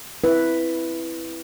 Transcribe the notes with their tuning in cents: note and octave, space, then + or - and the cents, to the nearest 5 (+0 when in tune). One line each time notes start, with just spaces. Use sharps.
C4 +0 E4 +0 B4 +0